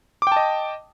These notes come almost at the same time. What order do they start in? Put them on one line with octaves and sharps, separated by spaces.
D6 G5 A5 D#5